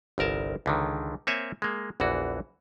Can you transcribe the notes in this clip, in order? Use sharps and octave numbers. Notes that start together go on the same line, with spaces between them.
G1 C2 A#4 A5
C#2 D3 D#3
A#3 C4 C#5 E5 G#5
G#3 A#3
A#1 E2 E3 F#4